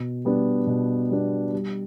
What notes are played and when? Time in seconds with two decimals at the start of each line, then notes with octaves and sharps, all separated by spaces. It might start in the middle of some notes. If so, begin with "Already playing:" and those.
Already playing: B2
0.25 G3 B3 D4
0.67 B2
1.10 G3 B3 D4
1.53 G3